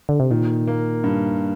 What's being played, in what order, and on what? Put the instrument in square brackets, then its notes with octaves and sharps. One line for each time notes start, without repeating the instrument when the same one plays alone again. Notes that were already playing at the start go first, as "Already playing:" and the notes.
[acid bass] D3
C3
[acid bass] A#2 [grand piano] D#3
[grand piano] A#3
G2